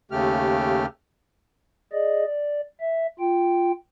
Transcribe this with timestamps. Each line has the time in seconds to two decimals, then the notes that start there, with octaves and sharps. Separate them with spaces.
0.12 D#2 C#3 A3 G4 F6
1.92 G#4 D5 D#5
2.26 D5
2.80 E5
3.19 F4 G5